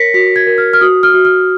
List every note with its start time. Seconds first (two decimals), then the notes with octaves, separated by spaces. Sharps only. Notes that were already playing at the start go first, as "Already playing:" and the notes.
Already playing: A#4 C#5 A#6 B6 C#7
0.14 F#4 B6
0.36 G#6
0.47 A#4
0.58 F6
0.73 F6
0.81 F#4 D#6
1.03 F6
1.14 F#4
1.25 F6